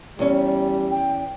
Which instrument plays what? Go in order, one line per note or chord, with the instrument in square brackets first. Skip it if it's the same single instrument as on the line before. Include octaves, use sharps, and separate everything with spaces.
[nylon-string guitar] E2 C#4 [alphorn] G3
[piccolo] G5